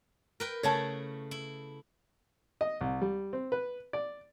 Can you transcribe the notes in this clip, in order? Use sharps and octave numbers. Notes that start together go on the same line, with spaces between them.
A#4 B4 G5
C#3 A3 E4 C#5 A5
E4
D#5
C2
G3
C4
B4
D5